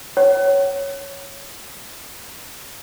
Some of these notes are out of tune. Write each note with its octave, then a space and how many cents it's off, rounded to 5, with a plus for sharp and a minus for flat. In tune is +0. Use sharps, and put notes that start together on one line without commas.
C#5 +0 F#5 +45